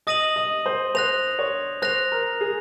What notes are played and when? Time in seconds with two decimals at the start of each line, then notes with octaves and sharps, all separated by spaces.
0.07 D#5 D#6 A#6 D#7 F#7
0.36 D#5
0.66 C5
0.95 C5 F#6 A#6 F7
1.39 C#5
1.82 C5 F#6 A#6 F7
2.12 A#4
2.41 G#4